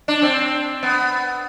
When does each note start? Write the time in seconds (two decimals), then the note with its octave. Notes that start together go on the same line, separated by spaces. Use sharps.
0.08 D4
0.22 C4
0.83 B3